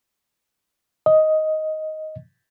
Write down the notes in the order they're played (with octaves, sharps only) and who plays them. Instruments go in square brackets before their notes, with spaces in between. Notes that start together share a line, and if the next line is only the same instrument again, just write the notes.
[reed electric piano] D#5